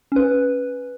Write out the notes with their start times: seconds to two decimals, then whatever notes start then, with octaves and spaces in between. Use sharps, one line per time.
0.12 C#4 B4